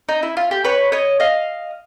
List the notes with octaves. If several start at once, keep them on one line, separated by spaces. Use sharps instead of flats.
D#4
E4
F4
G4
B4 C#5
C#5 D#5
D#5 F5